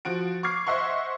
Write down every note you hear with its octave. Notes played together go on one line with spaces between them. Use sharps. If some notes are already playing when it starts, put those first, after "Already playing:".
F3 F#4 D7
C#6 D6 F6 G#6 C7
C5 D#5 E5 F#5 C6 C#6